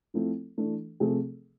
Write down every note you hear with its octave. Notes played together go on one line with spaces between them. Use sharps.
F3 A3 C4 E4
E3 A3 D4
C3 F3 A3 C4 G#4